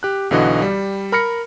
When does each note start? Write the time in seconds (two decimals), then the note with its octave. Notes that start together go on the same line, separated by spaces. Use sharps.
0.03 G4 F#6
0.31 B1 D3 E3 F#4 D#5
0.62 G3
1.12 A#4 B5 F6 A#6 C#7